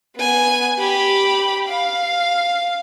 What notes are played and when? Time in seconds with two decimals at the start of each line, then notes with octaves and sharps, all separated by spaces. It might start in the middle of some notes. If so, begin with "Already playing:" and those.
0.17 B3 G#5
0.79 G4 B5
1.68 F5